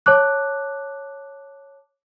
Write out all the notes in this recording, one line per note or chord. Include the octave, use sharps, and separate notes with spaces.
C#5 A5 D6 F#6